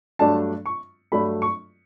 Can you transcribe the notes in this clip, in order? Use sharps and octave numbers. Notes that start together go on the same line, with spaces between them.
G2 F#3 A3 D4 A5
C#6
G2 F#3 A3 D4 B5
C#6